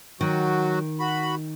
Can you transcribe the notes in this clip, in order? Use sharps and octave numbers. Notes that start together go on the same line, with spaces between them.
D#3 F#3 F#4
F#4 B5